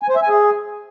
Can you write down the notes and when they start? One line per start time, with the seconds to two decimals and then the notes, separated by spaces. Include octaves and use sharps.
0.02 G#5
0.09 C5
0.16 E5
0.22 G#5
0.29 G#4